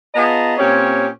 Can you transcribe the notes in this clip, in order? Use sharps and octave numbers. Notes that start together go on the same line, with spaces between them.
B3 F4 G#4 D#5 A5 A#5
A#2 C4 C#4 G4 C#5